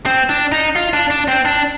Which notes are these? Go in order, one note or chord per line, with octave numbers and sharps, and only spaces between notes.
C4
D4
D#4
F4
D4
D4
C4
D4